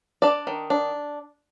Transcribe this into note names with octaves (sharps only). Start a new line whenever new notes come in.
D4 D5
D#3
D4